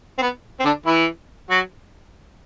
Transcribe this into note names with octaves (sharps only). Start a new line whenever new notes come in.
C4
B3
C4
D3 D4
E3 E4
F#3 F#4